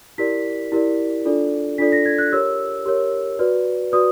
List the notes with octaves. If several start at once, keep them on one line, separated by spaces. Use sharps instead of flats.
E4 G4 A#4 D5 B6
E4 G4 A#4 D5
D4 F4 A4 D5
D4 F4 A4 D5 B6
A#6
G#6
F#6
G4 A#4 C#5 E6
G4 A#4 C#5
F#4 B4 D5
F#4 B4 D5 D#6